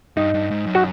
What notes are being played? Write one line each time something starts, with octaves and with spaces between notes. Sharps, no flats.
G2 D#4
G2
G#2
F#2
F#4